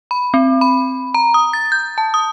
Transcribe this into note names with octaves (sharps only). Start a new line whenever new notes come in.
B5
C4
B5
A#5
D#6
A6
G6
A5
D#6